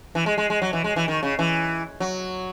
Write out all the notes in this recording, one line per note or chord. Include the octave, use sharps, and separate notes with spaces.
E3
G#3
G#3
G#3
F#3
E3
G#3
E3
D#3
C#3
E3
F#3